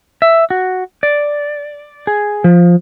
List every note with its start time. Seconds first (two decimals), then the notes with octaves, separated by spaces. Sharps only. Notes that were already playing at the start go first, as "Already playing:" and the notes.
0.22 E5
0.50 F#4
1.03 D5
2.07 G#4
2.44 F3